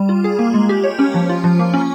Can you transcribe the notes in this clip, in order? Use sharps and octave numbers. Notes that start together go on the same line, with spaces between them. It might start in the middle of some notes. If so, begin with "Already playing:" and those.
Already playing: G3
F4
G#4
A#3
G#3
G4
C#5
C#4
F3
F4
F3
A#3
C#4